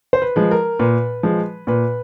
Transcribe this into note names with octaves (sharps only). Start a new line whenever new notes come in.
C5
B4
F3 G#3
A#4
A#2 B4
F3 G#3
A#2 B4